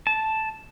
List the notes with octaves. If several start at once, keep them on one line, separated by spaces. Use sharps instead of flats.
A5